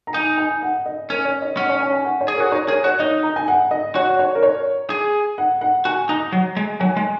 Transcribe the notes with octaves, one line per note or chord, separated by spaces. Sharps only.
A#5
D#4 G#5
G#5
F#5
D#5
C#4 A#4
C#5
D#5
C#4 F#5
D#5
C#5
G#5
G#5
F#5
C#5
G#4
F#4 A#4
D#4 C#5
G#4 A#4
F#4 C#5
D#4 D#5
A#5
G#5
F#5
D#5
F#4 C#5
C#5
A#4
C#5
G#4
F#5
F#5
F#4 G#5
D#4 A#5
F#3
G#3
F#3 G#5
G#3 G#5